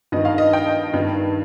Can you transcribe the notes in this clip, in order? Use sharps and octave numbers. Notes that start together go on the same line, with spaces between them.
G2 D#3 D#5
F5
D#5
G5
G2
D#3